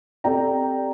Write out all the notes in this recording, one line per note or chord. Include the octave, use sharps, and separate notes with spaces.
C4 G4 A4 D5 G5 A#5